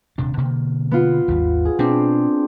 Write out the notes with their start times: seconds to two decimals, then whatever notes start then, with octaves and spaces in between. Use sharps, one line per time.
0.18 D#1 C3 D4
0.38 B2 D3 A#3
0.91 B3 F4
1.28 G#1 D#2 G3
1.65 G#4
1.79 B2 C4 D4